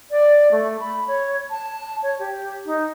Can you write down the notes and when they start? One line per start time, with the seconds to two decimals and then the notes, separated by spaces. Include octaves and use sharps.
0.11 D5
0.52 A3
0.80 B5
1.07 C#5
1.50 A5
2.03 C#5
2.19 G4
2.66 D#4